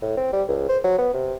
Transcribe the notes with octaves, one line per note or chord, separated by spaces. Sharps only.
A2
C4
G3
C#2
C5
F#3
B3
C3